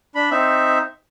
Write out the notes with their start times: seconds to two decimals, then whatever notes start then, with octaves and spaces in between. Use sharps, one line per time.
0.15 D4 B5
0.31 C4 D#4 E5